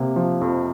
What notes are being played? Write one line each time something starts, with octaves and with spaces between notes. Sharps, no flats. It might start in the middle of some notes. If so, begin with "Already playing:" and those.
Already playing: C3 A#3
F3
F2